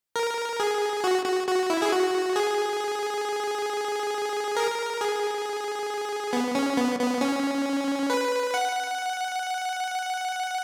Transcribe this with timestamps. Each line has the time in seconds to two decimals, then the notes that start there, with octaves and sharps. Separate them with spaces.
0.16 A#4
0.60 G#4
1.04 F#4
1.25 F#4
1.48 F#4
1.70 E4
1.82 G#4
1.92 F#4
2.36 G#4
4.57 A#4
5.01 G#4
6.33 B3
6.55 C#4
6.77 B3
6.99 B3
7.21 C#4
8.10 B4
8.54 F#5